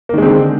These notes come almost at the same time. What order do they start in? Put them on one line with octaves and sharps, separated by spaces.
A#3 D#3 G#3 C4 D3